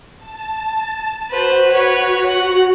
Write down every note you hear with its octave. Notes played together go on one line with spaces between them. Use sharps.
A5
F#4 B4 C5
B4 C#5
F#5